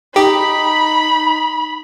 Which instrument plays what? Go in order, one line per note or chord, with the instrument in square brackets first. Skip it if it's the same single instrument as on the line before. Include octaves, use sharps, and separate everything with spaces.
[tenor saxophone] D#4 [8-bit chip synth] G4 [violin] B5